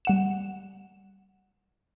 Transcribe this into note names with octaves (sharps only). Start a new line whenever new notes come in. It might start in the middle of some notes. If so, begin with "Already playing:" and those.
G3 F#5 E7